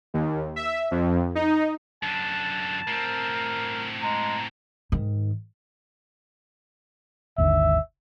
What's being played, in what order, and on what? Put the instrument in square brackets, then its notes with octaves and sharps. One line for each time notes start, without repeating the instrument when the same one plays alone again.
[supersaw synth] D#2
E5
F2
D#4
[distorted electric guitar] F#2 D3 [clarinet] A5
[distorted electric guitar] A2 C4 [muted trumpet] A#4
[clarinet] G#3 [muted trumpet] A#5
[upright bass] G#2 D#3
[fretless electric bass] G#1 D#2 D3 [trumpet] E5